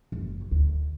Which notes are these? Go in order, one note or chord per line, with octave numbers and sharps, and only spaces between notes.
F#1
D2